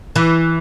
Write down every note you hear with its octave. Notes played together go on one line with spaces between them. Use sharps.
E3